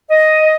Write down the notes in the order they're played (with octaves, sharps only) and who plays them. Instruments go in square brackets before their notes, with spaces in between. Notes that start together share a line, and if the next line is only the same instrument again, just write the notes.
[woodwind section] D#5